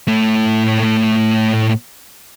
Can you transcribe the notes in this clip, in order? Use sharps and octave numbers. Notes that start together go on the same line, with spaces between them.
A2 A3